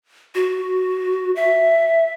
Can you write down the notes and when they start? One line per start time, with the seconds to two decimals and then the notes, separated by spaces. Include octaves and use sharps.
0.35 F#4
1.36 E5